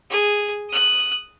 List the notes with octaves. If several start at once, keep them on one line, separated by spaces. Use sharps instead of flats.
G#4
D#6 F#6